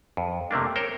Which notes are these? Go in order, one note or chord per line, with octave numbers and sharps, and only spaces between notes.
F2
C3 A3 A#3 D4
A#4 C5 C#5 G5